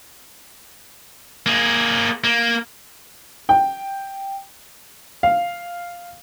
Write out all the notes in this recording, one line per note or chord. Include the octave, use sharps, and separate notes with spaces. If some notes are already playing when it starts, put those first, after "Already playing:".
A#3 G#4
A#3
G5
F5